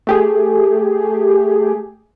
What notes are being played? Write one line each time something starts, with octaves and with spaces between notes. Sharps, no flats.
A3 G4 G#4